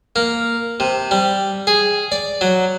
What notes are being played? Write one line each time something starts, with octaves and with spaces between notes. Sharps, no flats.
A#3
C3
G3
G#4
D5
F#3